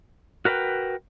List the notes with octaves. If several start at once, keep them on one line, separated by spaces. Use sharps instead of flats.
F#4 A#4 B4 D#5 G5